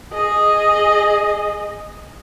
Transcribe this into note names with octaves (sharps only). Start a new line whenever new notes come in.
G#4 D#5